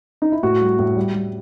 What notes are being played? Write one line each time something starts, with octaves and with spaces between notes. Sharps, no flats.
D#4
E4
A2 F#4
G3
A2
G3
G3